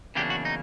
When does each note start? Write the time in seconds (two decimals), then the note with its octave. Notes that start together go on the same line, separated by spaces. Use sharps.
0.15 E2 C#3 F#3 A#3 D4 G4
0.30 F#4
0.45 D#4